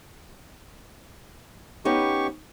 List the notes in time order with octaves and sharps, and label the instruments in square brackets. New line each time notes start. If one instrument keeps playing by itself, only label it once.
[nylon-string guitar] B3 C#4 D#4 [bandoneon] G4 C#6